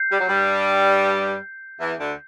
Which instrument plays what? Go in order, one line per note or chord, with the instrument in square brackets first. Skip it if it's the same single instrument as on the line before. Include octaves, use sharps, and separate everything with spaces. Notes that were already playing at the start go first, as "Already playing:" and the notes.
Already playing: [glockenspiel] G6 C7
[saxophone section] G3
F#3
G2 G3
E2 E3
D2 D3